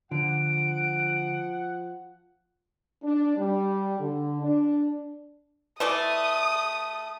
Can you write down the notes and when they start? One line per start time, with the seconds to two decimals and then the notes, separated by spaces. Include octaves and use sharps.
0.11 D3 F3 F#5 D7
3.03 D4
3.37 G3
3.99 D3
4.42 D4
5.80 E3 A3 D5 D#6